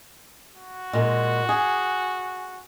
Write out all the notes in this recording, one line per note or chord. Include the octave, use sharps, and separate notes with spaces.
F#4
A#2 G#3
G#4